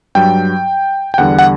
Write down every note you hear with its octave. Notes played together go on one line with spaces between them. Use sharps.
G2 F#3 G5
G5
E2 D3 G3 F#5
F#5